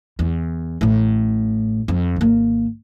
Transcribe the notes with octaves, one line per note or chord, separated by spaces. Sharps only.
E2
A1 A2
F2
G#1 A#3